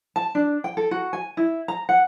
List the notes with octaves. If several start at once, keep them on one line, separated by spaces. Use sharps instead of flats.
A5
D4
G5
A4
F#4
G#5
E4
A#5
F#5